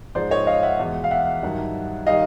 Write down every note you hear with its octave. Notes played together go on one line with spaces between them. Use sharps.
G#2 F3 G#3 C5 D5
C#5 D#5
D#5 F5
E5 F#5
E2 B2 G#3
F5
E5 F#5
G2 D#3 F#3
D#3 G3 D#5 F5